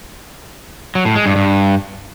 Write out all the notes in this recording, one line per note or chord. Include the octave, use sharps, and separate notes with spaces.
F#3
A2
G#3
G2
G2